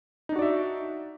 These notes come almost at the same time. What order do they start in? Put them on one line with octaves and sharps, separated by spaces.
D#4 D4 F#4 D5 E5